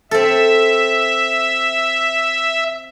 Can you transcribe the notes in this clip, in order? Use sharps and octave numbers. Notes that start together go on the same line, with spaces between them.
C4 A4 E5